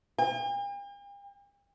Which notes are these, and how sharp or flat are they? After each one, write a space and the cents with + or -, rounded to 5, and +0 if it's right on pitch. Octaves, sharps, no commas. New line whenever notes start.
G5 +45